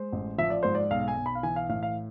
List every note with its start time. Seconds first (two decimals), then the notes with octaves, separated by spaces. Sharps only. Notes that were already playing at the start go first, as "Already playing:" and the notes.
Already playing: G#3 C5
0.12 A1
0.38 F3 E5
0.50 D5
0.63 G#2 C5
0.75 D5
0.91 B1 F5
1.08 G#5
1.17 B1
1.26 B5
1.35 F5
1.43 E3 G#5
1.56 F5
1.69 A2 F5
1.83 F5